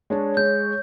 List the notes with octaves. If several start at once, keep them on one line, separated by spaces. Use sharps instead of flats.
G#3 D4 C#5 A5
G#3 G6